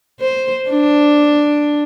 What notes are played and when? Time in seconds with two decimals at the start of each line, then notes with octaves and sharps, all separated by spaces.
0.20 C5
0.70 D4